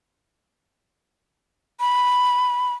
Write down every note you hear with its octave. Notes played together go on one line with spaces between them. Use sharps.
B5